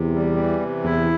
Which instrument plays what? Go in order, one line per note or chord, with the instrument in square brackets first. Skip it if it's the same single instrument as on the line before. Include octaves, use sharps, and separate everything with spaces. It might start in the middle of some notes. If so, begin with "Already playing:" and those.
Already playing: [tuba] E2 [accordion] C3
[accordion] G3
E3
C3
[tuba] E2 [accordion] E4